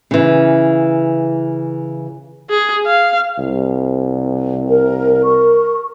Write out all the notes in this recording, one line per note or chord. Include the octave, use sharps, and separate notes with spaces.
C#3 E3
G#4
F5
C2
A#4
A#4 C#6